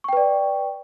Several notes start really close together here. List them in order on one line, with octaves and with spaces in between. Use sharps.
C#6 G5 B4 D5